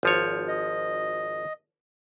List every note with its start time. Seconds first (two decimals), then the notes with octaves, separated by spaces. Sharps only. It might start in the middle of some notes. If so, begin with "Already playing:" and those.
0.03 G#1 F3 C#5
0.48 D#5